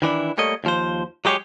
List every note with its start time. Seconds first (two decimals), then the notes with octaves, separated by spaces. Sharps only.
0.02 D#3 E3 D4 E4
0.38 G3 A3 A#3 C#5 D#5
0.64 D#2 F3 C5
1.25 F#3 G#3 G4 G#4 C#5